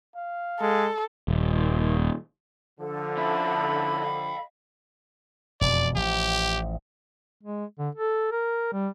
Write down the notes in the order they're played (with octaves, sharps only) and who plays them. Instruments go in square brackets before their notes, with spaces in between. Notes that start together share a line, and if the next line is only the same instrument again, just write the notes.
[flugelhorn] F5
[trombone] G#3 [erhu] A4
[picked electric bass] D#1
[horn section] D3 F3 [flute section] A4
[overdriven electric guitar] C#4 E4 [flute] B5
[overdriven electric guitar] D#5 F5
[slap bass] E1 F2 B2 [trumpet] D5
[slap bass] A1 F3 [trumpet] G4
[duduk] G#3
D3
A4
A#4
G3